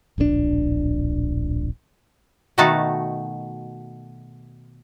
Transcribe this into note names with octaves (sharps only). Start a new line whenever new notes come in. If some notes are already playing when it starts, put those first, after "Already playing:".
D1 A#1 A2 D4
B2 D#3 A3 D#4 F#4 A5